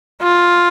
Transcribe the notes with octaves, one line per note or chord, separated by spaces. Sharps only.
F4